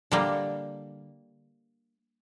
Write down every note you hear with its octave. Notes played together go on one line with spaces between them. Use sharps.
D3 G3 A#3